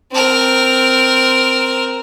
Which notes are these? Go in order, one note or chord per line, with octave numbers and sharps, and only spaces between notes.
C4 A#4